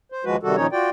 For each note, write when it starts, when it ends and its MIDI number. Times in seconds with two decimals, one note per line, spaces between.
0.12 0.25 72
0.25 0.36 39
0.25 0.36 53
0.25 0.36 56
0.25 0.36 66
0.25 0.36 71
0.43 0.56 48
0.43 0.56 51
0.43 0.56 55
0.43 0.56 66
0.43 0.56 69
0.56 0.67 46
0.56 0.67 51
0.56 0.67 53
0.56 0.67 61
0.56 0.67 63
0.56 0.67 73
0.72 0.90 65
0.72 0.90 66
0.72 0.90 74
0.72 0.90 79